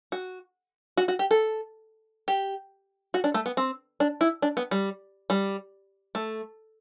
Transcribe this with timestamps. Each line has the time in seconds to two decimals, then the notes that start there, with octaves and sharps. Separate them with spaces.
0.12 F#4
0.97 F#4
1.08 F#4
1.19 G4
1.31 A4
2.28 G4
3.14 F#4
3.24 D4
3.34 A3
3.46 B3
3.57 C4
4.00 D4
4.21 E4
4.42 D4
4.57 B3
4.71 G3
5.30 G3
6.15 A3